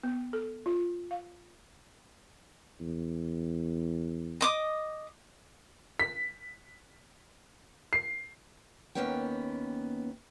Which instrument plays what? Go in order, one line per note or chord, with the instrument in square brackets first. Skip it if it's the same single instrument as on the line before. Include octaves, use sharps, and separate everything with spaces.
[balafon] B3
A4
F4
F5
[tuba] E2
[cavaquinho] D#5 D6 D#6
[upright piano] B6
C7
[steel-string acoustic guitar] D#2 C#3 A#3 B3 C#4 G5